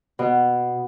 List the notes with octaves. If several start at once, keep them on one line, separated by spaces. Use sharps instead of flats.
B2